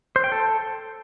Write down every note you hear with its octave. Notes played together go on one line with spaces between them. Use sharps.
C5
G5
A4